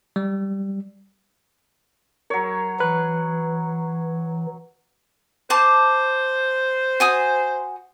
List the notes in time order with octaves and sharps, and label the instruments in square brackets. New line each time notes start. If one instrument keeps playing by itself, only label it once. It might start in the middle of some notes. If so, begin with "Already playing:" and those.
[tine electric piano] G3
[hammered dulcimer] F#3 C#5 [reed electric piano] A#4
[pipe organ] E3 [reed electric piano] B4 F#6
[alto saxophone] C5 [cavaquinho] A5 C6 D6
[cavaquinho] F#4 G#5 D#6